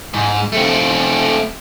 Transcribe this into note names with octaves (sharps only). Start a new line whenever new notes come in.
G#2
A3 C4